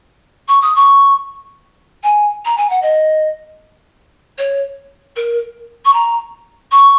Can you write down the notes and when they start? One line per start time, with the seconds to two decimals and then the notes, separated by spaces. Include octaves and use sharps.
0.48 C#6
0.61 D#6
0.75 C#6
2.03 G#5
2.44 A#5
2.57 G#5
2.69 F#5
2.82 D#5
4.38 C#5
5.15 A#4
5.84 C#6
5.93 A#5
6.71 C#6